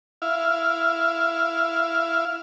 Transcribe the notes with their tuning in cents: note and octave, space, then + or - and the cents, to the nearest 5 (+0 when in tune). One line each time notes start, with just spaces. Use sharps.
E4 +15 F5 +0